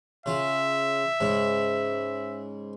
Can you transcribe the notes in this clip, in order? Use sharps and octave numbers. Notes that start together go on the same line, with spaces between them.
C#3 F4 E5
G#2 C#3